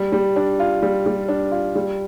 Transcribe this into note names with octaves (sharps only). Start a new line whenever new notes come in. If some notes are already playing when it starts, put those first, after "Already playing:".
Already playing: G3
G3
D4
F4
G3
G3
D4
F4
G3